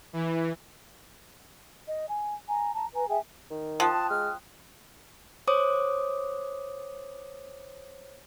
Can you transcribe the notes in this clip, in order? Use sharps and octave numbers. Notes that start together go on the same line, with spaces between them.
E3
D#5
G#5
G#5 A#5
A5 A#5
B4 G#5 A#5
G#4 E5 G5 G#5
D#3
F3 G5 A5 D#6 F#6
G#3 F6
C5 C#5 D6 D#6